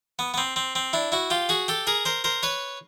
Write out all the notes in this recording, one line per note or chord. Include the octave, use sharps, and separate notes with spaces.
B3
B3
C4
C4
C4
D4 E4
E4 F#4
F4 G4
F#4 G#4
G4 A4
G#4 A#4
A#4 C5
A#4 C5
B4 C#5